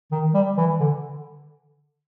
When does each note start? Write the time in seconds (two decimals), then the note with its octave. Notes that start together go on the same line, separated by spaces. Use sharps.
0.12 D#3
0.34 G3
0.57 E3
0.80 D3